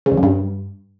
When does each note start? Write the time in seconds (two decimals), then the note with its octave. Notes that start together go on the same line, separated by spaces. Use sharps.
0.06 C#3
0.12 E2
0.17 F#2
0.23 G2